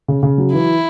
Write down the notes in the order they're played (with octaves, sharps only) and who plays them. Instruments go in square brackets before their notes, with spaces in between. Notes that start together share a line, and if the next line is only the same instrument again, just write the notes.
[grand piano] C#3
C#3
F#3
[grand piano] E3 [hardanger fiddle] E4